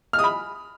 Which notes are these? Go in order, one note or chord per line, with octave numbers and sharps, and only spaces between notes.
F6
D#6
B5